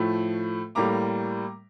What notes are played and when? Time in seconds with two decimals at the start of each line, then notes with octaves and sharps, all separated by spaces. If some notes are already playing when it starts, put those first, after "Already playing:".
Already playing: A2 F3 A3
0.75 A2 G3 A#3 A#5 D6